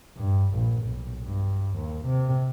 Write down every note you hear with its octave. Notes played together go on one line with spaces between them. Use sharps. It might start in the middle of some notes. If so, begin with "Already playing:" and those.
G2
A#1
B1
G2
D#2
C3